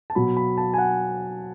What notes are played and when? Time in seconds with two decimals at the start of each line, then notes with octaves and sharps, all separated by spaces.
0.10 A5
0.15 B2 F#3 B5
0.37 B5
0.58 A5
0.74 G#5
0.78 F#5